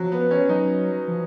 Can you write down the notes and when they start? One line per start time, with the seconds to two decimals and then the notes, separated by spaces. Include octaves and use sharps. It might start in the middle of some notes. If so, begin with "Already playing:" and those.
Already playing: F3 F#3
0.12 B3
0.31 C#4
0.49 F#3 D#4
1.08 F3